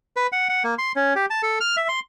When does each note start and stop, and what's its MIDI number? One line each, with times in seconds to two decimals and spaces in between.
0.16 0.27 71
0.32 0.48 78
0.49 0.63 78
0.64 0.74 58
0.78 0.92 84
0.96 1.14 61
1.16 1.26 67
1.30 1.42 81
1.43 1.59 69
1.61 1.76 89
1.77 1.88 76
1.88 2.00 84